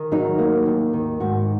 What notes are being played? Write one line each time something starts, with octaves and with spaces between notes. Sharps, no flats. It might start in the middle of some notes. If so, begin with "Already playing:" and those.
Already playing: D#3
F#3 D#4
A#3
D#2
D#3
G#2 F#4